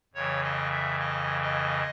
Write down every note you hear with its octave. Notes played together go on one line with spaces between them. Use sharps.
F2 C#3 E3 C#5
D#5
E5
D#5
D#5